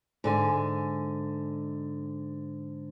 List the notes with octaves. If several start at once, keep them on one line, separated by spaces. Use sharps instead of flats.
G#2 D3 G#5